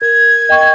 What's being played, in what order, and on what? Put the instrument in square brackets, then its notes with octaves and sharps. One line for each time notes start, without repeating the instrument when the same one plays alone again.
[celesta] A#4 [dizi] G#6
[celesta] D#5 G5 C#6